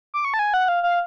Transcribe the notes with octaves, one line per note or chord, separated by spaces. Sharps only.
D6
C#6
A5
G#5
F#5
F5
F5